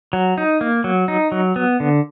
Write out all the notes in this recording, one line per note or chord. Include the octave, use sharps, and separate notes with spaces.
F#3
D#4
A#3
F#3
D#4
F#3
B3
D3